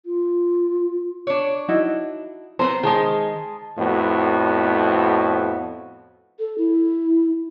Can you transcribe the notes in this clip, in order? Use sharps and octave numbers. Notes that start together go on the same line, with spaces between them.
F4
D4 C#5
D#4 E4 F#4
B3 C4 B4 C5 A#5 C6
D#3 G#3 G#4 A5 D#6
F2 A2 B3 F#4
A4
E4